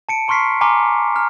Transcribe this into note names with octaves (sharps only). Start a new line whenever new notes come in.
A5 C#7 D7
A#5 C6 C#6 F6 B6 C7
G#5 A#5 C6 D6 F6
A#5 F6